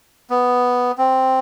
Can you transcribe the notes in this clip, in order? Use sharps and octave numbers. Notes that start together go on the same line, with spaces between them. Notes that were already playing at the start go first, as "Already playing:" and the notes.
B3
C4